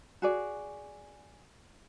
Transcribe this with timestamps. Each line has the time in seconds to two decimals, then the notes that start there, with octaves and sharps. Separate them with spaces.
0.22 F#4 G#4 D5